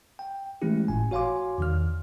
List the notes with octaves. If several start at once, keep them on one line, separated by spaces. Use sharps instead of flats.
G5
E3 G#3 A3 C#4 E4 G4
G1 A2 G#5
F#4 C#5 F5 G#5 C6 D6
E2 D#3 F6